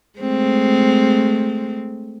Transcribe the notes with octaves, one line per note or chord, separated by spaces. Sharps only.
G#3 A3 C4